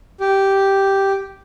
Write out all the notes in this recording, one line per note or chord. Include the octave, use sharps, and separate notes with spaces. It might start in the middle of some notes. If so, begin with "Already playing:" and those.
G4